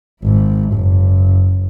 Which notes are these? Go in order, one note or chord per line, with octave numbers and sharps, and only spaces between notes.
G#1 G#2
F#1